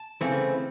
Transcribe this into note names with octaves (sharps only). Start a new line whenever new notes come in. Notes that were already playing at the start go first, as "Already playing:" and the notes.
Already playing: A5
C#3 E3 A3 C4